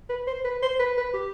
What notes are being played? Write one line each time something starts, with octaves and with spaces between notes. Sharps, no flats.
B4
C5
B4
C5
B4
B4
G4